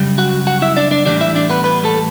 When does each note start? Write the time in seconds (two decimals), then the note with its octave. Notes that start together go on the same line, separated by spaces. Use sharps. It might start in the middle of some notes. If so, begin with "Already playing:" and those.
Already playing: F#2 C#3 G3
0.18 F#4 F#5
0.47 F#4 F#5
0.62 E4 E5
0.77 D4 D5
0.91 D4 D5
1.05 A2 E3 G3 D4 D5
1.21 E4 E5
1.35 D4 D5
1.50 B3 B4
1.64 B3 B4
1.84 A3 A4